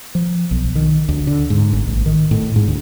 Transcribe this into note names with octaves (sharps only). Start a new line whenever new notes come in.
F3
B1
D#3
D2
D3
G#2
G1
A1
D#3
A2
G#2
D2